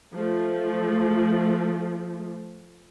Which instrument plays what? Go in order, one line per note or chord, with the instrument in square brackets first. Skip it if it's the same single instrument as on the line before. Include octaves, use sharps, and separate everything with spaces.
[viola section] F3 A3